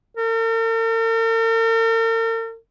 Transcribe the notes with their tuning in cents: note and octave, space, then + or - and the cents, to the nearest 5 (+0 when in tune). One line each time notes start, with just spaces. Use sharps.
A#4 -45